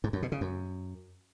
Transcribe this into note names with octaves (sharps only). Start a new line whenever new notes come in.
G#2
F#2
B2
C#3
F#2